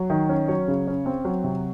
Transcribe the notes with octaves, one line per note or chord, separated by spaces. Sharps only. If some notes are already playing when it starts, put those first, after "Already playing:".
Already playing: F#3
D#3
C#4
F#3 C#5
C#3
C#4
C4
F#3
C3